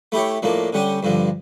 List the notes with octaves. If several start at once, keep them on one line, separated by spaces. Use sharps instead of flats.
A3 E4 G4 C#5
A2 F3 A#3 D4
D3 G3 C#4 G4
G2 D3 F3